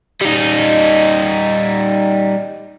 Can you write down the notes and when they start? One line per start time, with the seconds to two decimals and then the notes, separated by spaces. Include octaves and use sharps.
0.21 G3 D#4